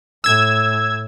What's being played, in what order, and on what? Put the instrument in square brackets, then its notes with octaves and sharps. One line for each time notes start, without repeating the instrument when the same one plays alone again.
[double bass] A2 [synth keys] E6 G#6